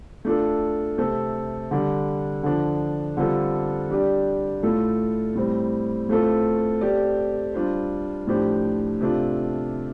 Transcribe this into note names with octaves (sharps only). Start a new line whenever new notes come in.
A3 D4 F4 A4
C3 A3 C4 A4
D3 G3 D4
D3 F3 D4
D3 G3 C4 F4 A4
G3 D4 G4 D5
A2 A3 F4 A4
A2 G3 C4
A2 A3 C4 F4 A4
A3 C4 G4 D5
G3 D4 F4 C5
A2 F3 D4 G4 C5
C3 A3 D4 F4